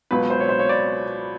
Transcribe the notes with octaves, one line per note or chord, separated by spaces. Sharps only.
C#2 B2 F#3 B4
C5
C#5
C5
C#5
D5